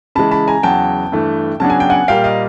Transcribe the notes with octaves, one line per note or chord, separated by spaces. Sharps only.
C#3 E3 G#3 A5 B5
A5 B5
G#5 A#5
E2 C#3 F#3 B3 G5 A5
G2 E3 A3
C#3 F#3 B3 D4 A5
G#5
G5
F#5 G#5
A#2 G3 A#3 F5 G5
D#5 F5